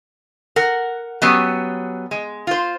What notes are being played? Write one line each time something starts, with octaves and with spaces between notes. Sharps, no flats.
A#4 F#5
F#3 G3 B3 C#4
G#3
F4 C5